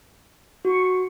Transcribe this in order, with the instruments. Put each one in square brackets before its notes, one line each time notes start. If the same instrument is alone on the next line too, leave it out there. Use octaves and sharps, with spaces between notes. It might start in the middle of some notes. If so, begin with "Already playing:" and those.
[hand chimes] F#4 [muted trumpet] C#6